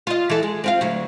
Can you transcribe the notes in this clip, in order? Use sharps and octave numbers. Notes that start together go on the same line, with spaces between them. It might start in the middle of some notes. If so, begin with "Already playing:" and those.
F4 D#5
E3 A4
G#3
C4 F4 F5
D2 F#3